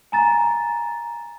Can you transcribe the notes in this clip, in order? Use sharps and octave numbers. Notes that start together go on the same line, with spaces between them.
G#5 A#5 A6